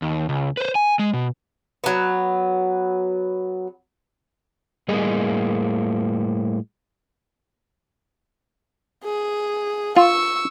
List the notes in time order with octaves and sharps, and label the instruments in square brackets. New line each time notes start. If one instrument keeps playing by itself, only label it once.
[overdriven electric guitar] D#2
C#2
B4 C5
G#5
G#3
B2
[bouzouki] F#3 B3
[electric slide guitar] A2 G3 A#3 G#4 D#5
[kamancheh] G#4
[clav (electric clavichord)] F4 [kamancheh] C#6 E6